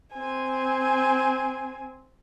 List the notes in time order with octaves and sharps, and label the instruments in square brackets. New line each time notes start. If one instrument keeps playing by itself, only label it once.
[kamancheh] C4 G#5